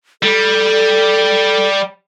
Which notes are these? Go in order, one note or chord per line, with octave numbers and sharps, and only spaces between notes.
G3 A4